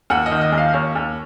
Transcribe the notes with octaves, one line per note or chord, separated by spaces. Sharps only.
D#2 F#5
D#5
D#3
D#5
D#2
F5
D#2 C#5
D#2